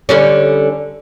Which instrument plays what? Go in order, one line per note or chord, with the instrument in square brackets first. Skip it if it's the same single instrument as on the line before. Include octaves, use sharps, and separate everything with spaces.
[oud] D3 G3 C#4